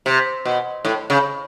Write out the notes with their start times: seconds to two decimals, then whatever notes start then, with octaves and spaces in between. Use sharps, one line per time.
0.06 C3
0.45 B2
0.85 A2
1.10 C#3